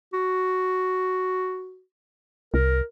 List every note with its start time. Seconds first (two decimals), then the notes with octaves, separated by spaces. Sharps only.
0.13 F#4
2.54 C2 A#4